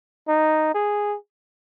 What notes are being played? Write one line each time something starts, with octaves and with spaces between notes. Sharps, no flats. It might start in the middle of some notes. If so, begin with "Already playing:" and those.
D#4
G#4